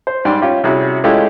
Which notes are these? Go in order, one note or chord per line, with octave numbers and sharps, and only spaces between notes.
C5
G#2 G3 D5 G5 C6
C#4 F4 G4
C3 G3 C#4 E4 F#4 G#4
G#3 A3 C#4 E4 F4 G4